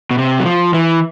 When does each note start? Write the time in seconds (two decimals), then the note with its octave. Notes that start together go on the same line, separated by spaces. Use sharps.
0.11 B2
0.18 C3
0.40 F#3
0.45 F3
0.74 E3